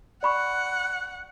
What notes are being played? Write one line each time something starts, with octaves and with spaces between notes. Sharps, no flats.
D5 F#5 B5 C#6